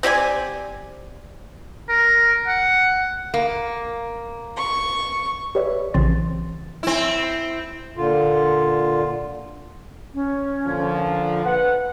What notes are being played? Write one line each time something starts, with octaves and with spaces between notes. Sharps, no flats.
C4 G4 D5 G#5
A#4
F#5
A#3
C#6
G4 B4 C#5 D5 E5
A#1 C#3 E3 C4 C6 A6
C4 E4
A#2 D3 F4
C#4
A#2 D3 F3
B4 F#5